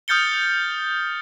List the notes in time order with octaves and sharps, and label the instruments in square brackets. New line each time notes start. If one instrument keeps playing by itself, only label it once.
[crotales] D#6 F6 G6 A6 C#7 G7